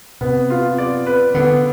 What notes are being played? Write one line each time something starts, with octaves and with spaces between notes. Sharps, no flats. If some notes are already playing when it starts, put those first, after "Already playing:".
C3 B3
F4
D5
B4
D3 B3